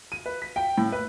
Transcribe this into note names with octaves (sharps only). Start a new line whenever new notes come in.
D#7
B4
B6
G5
A2
B4